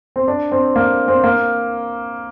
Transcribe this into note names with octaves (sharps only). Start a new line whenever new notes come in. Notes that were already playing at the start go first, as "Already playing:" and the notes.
C4
D4
C4
A#3
C4
A#3